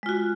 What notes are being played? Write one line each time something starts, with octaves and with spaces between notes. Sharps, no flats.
G#3 F4 F#4